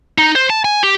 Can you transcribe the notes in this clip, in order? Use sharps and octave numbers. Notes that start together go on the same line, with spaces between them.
D#4
C5
A5
G#5
G4